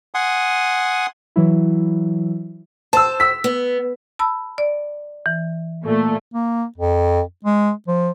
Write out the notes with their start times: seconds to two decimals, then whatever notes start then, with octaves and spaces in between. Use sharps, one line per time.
0.14 F#5 G#5 C6 D#6
1.36 E3 F#3 E4
2.93 C5 A5 E6
3.20 E6 B6
3.44 B3
4.19 A5 B5 E6
4.58 D5
5.26 E3
5.85 A#2 A3
6.34 A#3
6.77 F2
7.45 G#3
7.88 F3